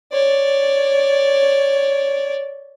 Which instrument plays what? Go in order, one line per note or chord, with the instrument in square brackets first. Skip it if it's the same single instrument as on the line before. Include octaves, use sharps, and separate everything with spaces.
[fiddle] C#5 D5